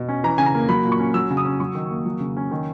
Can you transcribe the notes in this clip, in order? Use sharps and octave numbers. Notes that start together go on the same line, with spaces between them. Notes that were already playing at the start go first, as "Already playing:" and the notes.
Already playing: B2
C#4
E3 A#5
C#3 G#5
A#5
A#3
F#3 B5
A#2
C#6
C#4
F#3 E6
C#3
D#6
C#4
F#3 C#6
D#3
A#3
F#3
C#3
C#4
D#3